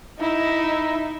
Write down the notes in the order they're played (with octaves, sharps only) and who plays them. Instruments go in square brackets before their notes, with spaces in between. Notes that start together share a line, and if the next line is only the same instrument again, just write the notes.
[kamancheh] D#4 E4